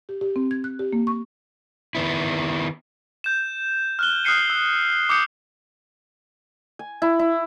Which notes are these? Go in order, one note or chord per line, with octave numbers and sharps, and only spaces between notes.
G4
G4
C4
G#6
F#6
G4
A#3
C#6
D#3 B3 E4
G6 E7
F6 F#6 G7
D#6 F6 F#6 C7 C#7 D#7
E6
D6 D#6 G6 C#7
G#5
E4
E4